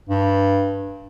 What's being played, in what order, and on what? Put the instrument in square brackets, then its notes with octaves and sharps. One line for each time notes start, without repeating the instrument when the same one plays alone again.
[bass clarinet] G2